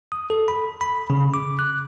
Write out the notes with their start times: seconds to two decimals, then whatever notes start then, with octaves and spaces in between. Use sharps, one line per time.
0.12 D#6
0.30 A4
0.48 B5
0.81 B5
1.10 C#3
1.34 D6
1.59 F#6